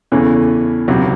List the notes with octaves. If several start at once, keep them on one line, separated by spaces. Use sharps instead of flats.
E2 C#3 E3 A3 C#4
C#2 C3 F#3